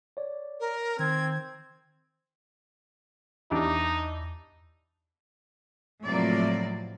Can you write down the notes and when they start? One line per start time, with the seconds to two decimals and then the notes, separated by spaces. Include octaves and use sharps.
0.17 C#5 D5
0.60 A#4
0.99 D#3 C4 G#6
3.51 E2 E3 D4 D#4 G4
6.05 A2 C3 F3 F#3 A#3 D5